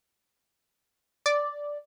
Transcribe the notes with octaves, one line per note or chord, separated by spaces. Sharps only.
D5